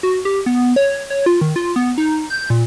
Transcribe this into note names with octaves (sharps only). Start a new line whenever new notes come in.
F#4
G4
B3
C#5
C#5
F4
D#3
F4
B3
D#4
G6
A#2